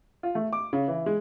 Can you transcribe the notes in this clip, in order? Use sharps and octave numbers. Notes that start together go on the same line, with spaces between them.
F4
A3
D6
C#3
E3
G#3